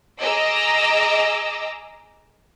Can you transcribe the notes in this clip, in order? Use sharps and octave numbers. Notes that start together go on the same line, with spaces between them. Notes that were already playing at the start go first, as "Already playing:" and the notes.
G#4 D#5 A#5 D6 E6